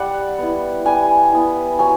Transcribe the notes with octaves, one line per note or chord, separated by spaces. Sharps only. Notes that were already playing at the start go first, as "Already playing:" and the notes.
Already playing: G3 F#5
B3 E4
G3 G#5
B3 E4
F#3 G#5